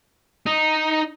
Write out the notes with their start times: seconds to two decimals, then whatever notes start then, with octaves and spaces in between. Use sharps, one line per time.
0.46 D#4